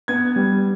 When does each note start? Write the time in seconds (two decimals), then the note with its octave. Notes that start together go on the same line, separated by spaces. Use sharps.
0.08 B3 G#6
0.36 G3